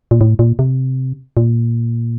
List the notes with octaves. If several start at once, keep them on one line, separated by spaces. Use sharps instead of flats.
A#2
A2
A#2
C3
A#2